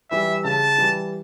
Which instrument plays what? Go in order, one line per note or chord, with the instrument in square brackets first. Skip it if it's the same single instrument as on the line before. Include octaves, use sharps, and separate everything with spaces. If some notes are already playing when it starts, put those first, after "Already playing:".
[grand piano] E3 G3 [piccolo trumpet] E5
[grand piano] C#3 [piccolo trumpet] A5
[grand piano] E3 G3